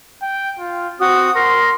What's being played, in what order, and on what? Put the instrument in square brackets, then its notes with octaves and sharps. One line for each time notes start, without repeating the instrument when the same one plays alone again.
[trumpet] G5
F4
[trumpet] C4 [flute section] F#4 D#6
[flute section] A#4 [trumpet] C6